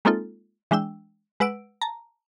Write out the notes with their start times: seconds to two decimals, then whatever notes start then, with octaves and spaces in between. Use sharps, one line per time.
0.05 G#3 A#3 C4 D#4 F4 A4
0.71 E3 G#3 D4 G5 E6
1.40 G#3 B4 F#5 E6 D7
1.81 A5 A#5